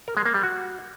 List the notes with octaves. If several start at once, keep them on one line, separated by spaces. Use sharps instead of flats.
A#4
G#3
A#3
G3
F#4